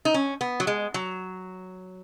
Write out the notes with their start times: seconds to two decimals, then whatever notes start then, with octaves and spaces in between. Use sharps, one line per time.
0.05 D#4
0.14 C#4
0.41 B3
0.60 F#3
0.67 G#3
0.94 F#3